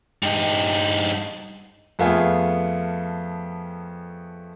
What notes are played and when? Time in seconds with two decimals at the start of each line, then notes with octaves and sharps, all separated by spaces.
0.23 G2 D#4
1.99 F2 A3 B3 F4 G#4